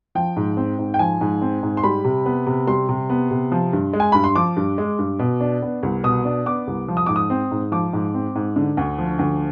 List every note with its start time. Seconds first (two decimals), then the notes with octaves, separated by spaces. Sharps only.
0.15 F3 G5
0.36 G#2
0.57 C4
0.79 G#2
0.94 G5
0.99 F3 G#5
1.21 G#2
1.42 C4
1.63 G#2
1.77 C6
1.83 G3 B5
2.05 C3
2.26 B3
2.47 C3
2.67 G3 C6
2.89 C3
3.10 B3
3.31 C3
3.52 F3
3.73 G2
3.93 G#3
4.00 G#5
4.12 G2 B5
4.24 C6
4.36 F3 D6
4.57 G2
4.78 G#3
4.99 G2
5.19 B2
5.41 D4
5.62 B3
5.83 C2
6.04 B2 D#6
6.25 D4
6.46 B3 D6
6.67 C2
6.88 F3
6.97 D#6
7.06 G#2 D6
7.16 D#6
7.30 C4
7.51 G#2
7.72 F3 D6
7.93 G#2
8.14 C4
8.35 G#2
8.56 D3
8.77 D2
8.98 F3
9.19 D2